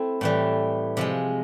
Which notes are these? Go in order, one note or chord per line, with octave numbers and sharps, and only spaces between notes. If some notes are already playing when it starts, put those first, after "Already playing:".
Already playing: A3 C4 E4
A2 E3 G3
C3 F3 G#3